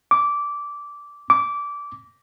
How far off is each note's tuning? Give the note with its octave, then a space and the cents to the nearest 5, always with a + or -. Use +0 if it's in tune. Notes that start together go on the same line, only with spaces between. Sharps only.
D6 -15
D6 -20